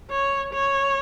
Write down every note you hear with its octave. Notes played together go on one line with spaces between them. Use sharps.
C#5
C#5